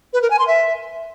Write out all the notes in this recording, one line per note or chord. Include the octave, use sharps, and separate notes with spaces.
B4
A#4
G#5
C6
E5